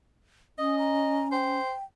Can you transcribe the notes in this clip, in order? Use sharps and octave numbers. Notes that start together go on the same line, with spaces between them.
C#4 D#5 D#6
A#5
C5 G5